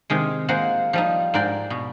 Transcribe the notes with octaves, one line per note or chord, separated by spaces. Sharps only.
C3 D#3 G#3
G#3 A#3 F4 C5 F#5
F3 G3 D#4
G#2 A#4 D5 G5
B2